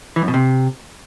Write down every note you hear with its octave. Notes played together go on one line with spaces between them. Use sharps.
E3
F#2
B2
C3